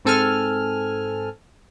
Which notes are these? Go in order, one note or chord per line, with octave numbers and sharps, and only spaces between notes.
G#2 C4 A4 G#5 F6